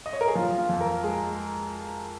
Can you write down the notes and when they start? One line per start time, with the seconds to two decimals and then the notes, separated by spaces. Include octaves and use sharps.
0.06 D#5
0.13 C#5
0.21 A#4
0.28 G#4
0.35 F3 F4
0.58 F4
0.69 F2
0.81 A#4
1.03 G#3 G#4